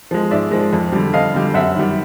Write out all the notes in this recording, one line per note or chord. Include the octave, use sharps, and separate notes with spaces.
F3 G#3
G#2 D5 E5
F3 G#3
F2
D3 G3
F2 D#5 F5
D3 G3
F#2 E5 F#5
D#3 G3